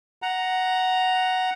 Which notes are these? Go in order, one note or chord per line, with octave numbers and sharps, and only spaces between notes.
F#5 A#5